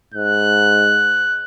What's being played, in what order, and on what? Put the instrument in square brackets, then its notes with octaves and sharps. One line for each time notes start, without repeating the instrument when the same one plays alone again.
[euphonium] G#2 [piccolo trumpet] F#6